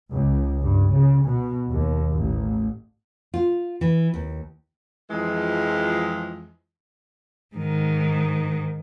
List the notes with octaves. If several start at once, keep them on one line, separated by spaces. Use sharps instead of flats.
C#2
G2
C#3
B2
D#2
A1
F4
E3
D#2
F2 E3 F3 G#3
G#2 D#3